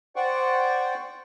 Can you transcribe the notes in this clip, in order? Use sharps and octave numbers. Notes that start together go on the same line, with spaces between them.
C5 D5 F#5 G5 C#6